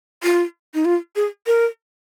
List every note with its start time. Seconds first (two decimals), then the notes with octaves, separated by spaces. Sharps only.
0.23 F4
0.74 D#4
0.85 F4
1.16 G#4
1.47 A#4